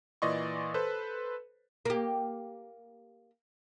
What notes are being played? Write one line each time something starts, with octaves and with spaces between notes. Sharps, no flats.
A#2 E3 D5 D#5 C6 C#6
A4 B4 C5
A#3 G4